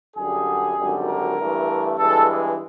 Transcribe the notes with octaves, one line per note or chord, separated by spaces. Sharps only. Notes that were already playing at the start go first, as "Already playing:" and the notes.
F#2 D3 G3 G#4
G#1 F#2 D3 G3
A#4
G2 E3 A3
G2 E3 G#3 A4
G#4